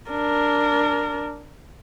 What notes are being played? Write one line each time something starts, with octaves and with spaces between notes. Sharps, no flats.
D4 A#4